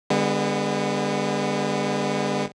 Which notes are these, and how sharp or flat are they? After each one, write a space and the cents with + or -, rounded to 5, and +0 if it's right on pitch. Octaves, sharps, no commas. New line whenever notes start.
D3 +0 G#3 -45 B3 +0